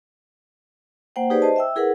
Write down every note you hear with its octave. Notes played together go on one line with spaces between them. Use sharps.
A#3 C5 F#5 G5
D#4 G4 G#4 B4 C5 D5
C5 D#5 A5
E5 G5 E6
E4 G#4 A#4 B4 F#5